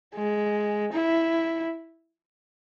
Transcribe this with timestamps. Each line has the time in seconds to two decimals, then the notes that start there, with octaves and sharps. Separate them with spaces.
0.15 G#3
0.93 E4